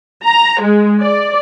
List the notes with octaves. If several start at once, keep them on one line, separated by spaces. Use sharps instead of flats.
A#5
G#3
D5